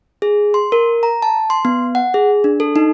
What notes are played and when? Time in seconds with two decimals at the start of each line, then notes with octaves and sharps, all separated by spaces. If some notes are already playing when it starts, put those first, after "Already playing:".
0.22 G#4
0.54 C6
0.72 A#4
1.03 A#5
1.22 A5
1.50 C6
1.65 B3
1.95 F#5
2.14 G#4
2.44 D4
2.60 A4
2.76 D#4